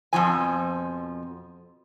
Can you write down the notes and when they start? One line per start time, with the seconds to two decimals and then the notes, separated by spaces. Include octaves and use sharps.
0.13 F2 B2 F3 G#5